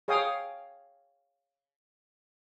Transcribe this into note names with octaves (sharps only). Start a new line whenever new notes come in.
G#4 C#5 F5 G5 D#6